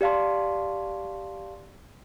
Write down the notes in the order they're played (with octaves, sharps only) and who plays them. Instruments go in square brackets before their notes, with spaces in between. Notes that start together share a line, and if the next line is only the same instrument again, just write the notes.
[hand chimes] G4 D5 F5 A5 C6